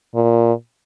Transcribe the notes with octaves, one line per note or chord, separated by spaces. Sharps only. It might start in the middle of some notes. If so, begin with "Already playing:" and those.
A#2